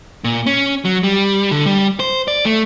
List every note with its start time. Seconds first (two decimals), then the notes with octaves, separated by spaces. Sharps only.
0.24 A#2
0.46 C#4
0.85 F#3
1.03 G3
1.51 D3
1.66 G3
2.00 C5
2.28 D5
2.45 A3